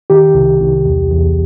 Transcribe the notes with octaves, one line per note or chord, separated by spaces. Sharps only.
D#3 G4
C2
C2
E2
E2